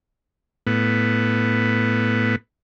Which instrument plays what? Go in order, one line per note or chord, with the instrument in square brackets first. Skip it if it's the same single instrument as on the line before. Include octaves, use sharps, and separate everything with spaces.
[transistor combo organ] A2 B3